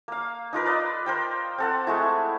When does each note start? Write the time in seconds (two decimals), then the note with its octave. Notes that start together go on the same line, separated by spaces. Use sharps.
0.08 A#3 F5
0.53 D#4 F4 A#4 B4
0.66 B4 D5 D#5
1.06 A#4 C5 G5
1.58 C4 A4 F#5
1.87 G#3 A3 E4